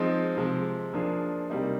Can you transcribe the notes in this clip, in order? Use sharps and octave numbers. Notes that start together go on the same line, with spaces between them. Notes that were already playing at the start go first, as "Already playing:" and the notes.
Already playing: F3 G#3 C4 D#4
C3 F3 G#3
F3 A#3 D4 G#4
C3 G3 A#3 D#4